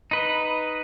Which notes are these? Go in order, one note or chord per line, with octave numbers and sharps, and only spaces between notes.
D#4 B4 D#5